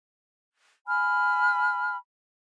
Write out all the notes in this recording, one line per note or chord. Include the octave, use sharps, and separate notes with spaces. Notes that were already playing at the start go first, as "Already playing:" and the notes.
G#5 B5 F6